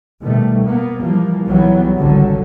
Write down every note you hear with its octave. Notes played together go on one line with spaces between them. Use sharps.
B2 D#3 G3 A3
A#3 B3
E3 F3 G3 A#3
B1 E3 F#3 G3 B3
G#1 C#2 D3 F#3 G3